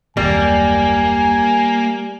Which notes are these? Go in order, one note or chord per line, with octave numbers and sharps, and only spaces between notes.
F#1 D#2 G3 A#3 G#5